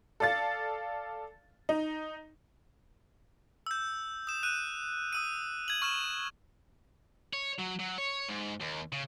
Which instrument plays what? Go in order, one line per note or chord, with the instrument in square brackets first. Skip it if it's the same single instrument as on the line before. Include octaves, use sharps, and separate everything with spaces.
[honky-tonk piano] A4 D5 F5 A6
D#4
[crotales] E6 G6
D#6 E7
F#6 D#7
D#6 E6 D#7
G#6 F#7
C#6 F6 E7
[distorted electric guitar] C#5
F#3
F#3
C#5
G#2
D#2
C#3